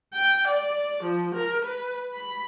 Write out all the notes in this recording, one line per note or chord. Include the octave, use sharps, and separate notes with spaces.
G5
D5
F3
A#4
B4
B5